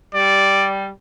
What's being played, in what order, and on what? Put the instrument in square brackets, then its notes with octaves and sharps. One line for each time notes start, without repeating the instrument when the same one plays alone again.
[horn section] G3 [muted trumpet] D5